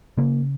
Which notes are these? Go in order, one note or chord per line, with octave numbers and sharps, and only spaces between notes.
C#3 A#3